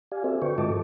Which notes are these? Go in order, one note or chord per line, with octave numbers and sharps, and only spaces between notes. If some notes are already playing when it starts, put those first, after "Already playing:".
G4 D5 F5 G#5
C4 F#4 A4 C5 D5 E5
D3 F#4 B4 G5 C#6
G#2 G#3 F4 D#5 A5 D6
E3 A4